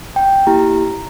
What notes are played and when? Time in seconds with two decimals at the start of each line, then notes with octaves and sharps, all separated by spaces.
0.16 G5
0.47 A#3 E4 G4 A#5